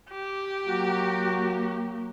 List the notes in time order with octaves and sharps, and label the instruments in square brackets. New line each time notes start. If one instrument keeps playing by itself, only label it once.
[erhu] G4
[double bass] F#3 A#3 [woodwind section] F#4